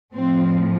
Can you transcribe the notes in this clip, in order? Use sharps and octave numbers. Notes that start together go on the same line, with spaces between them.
A2 F3 C4